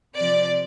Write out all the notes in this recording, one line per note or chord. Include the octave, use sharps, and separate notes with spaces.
C3 F3 D5